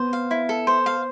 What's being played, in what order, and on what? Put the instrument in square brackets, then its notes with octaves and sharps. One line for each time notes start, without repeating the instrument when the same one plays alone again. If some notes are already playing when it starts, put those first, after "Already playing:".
Already playing: [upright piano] B3 [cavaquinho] C5
[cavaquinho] F5
E4
A4
C5
F5